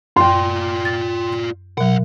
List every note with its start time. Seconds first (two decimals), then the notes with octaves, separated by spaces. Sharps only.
0.16 F#2 F4 D5 G5 C6
0.85 A6
1.78 C2 B2 F#3 F#5